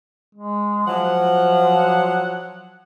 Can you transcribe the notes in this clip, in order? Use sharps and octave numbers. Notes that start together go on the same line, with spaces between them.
G#3
F3 F#3 F#5